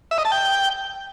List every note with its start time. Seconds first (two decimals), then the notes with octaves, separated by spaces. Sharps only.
0.11 E5
0.18 D#5
0.25 A5
0.32 G5